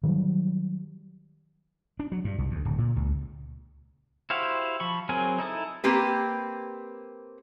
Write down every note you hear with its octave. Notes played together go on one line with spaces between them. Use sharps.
D#3 F#3 G3
D4
F#3
G2
C2
D2
D1
A#2
C#2
E4 F#4 G4 C5 F5
F3 B5 C#6
F#3 C4 G#4 A#4 G#5
D#4 E4 A4 D#6
A#3 C4 G4 B4